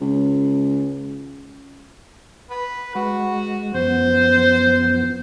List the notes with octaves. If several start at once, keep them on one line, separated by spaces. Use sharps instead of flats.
C#2
B4
G#3 F#4
F#2 F3 B3 C5